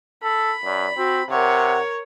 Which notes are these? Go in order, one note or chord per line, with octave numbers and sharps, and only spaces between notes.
A4 B5
F#2 D5
C4 F#4
C3 A#4 C#5 F#5